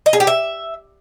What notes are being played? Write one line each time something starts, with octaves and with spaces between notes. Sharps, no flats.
D#5
G#4
G4
E5